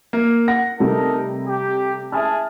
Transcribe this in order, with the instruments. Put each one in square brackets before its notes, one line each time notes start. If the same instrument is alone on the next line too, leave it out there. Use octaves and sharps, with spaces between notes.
[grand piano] A#3
[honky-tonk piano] F#5 [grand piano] A#6
[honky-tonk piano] C3 G3 A3 [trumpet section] D#4 A4 A#4
[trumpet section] G4
[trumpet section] G#4 A5 [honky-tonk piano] E5 G#5 F6